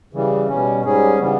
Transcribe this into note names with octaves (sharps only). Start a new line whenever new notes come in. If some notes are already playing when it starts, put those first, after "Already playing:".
C#3 E3 G3
B2 G3 C#4
G#2 G3 C#4 G#4
C#3 E3 G3 B3